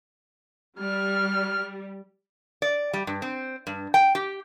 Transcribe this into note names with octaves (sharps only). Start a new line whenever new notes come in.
G3 F6
D5
G3
G2
C4
G2
G5
G4